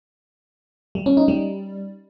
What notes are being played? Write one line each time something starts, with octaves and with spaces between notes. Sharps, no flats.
G3
C#4
D#4
G3